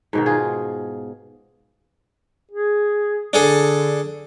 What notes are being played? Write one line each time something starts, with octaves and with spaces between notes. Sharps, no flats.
G#2 B2 D#3
F4 G#4
G#4
D3 D4 G#4 A4